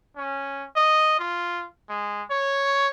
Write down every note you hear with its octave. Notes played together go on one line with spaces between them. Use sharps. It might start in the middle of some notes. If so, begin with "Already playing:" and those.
C#4
D#5
F4
G#3
C#5